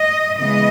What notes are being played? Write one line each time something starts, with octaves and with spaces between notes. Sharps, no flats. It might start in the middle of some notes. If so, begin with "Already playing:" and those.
Already playing: D#5
C#3 E3 G#3 B3 D#5